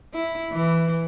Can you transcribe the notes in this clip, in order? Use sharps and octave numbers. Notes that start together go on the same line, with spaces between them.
E4
E3